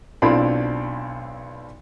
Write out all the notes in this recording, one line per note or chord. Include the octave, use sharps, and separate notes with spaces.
B1 C4 D4 E4 F4 B5